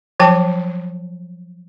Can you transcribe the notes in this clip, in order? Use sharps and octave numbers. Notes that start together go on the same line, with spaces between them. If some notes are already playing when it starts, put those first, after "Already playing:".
F3 F#3 G5 A5